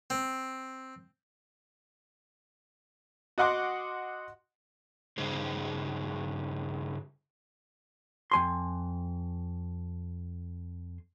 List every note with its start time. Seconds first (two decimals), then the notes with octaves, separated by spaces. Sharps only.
0.10 C4
3.38 F#4 D#5 F#5 C6 D6
5.18 G2 C#3 D#4 G#4 C5
8.32 F2 G#5 C6